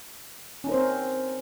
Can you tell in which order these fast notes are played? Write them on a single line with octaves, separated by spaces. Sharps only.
C#4 D#4 A#4 C5 C4